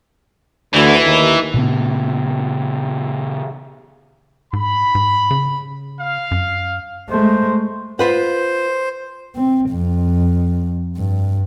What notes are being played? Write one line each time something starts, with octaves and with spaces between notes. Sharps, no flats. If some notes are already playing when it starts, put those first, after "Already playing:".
D2 E3
D#2
A#2 C#3 B3
G#2 B5
G#2
C#3
F5
F#2
G#3 A3 C5
F4 B4 C5 F#5
C4
F2
G2